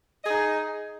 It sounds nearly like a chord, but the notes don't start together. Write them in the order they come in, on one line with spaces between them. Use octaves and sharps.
D#5 G#4 D#4